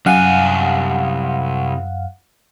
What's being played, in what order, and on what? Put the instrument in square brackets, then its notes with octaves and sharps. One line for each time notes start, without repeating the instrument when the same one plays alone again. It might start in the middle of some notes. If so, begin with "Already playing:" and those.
[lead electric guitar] C2 G#5 [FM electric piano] F#2 F5 F#5